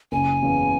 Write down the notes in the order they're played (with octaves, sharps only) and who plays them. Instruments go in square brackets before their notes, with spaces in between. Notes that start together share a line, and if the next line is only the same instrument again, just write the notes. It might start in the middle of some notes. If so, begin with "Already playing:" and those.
[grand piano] F#1 [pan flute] G#5
[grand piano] E2 C#3